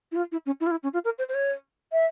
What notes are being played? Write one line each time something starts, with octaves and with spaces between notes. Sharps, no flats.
E4
F4
E4
C#4
E4
F4
E4
C#4
F4
A#4
C5
C5
C#5
E5